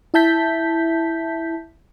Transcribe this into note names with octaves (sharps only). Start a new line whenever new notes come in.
E4 E5 A5 G6 B6